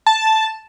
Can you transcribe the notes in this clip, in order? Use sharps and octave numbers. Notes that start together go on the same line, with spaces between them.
A5